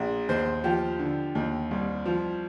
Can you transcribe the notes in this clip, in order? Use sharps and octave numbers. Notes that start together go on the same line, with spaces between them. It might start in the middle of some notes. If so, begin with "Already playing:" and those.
Already playing: A#1
D#2 C5
F3 G4
D3
D#2
C2
F3